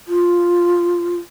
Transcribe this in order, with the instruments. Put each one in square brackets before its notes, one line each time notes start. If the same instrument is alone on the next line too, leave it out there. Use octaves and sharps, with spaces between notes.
[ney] F4